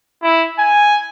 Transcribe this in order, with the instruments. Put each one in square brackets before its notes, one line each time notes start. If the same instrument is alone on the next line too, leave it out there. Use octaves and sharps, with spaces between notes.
[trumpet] E4
G#5